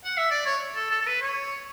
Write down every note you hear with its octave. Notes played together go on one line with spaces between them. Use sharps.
F#5
E5
D5
C#5
A4
A4
A4
B4
C#5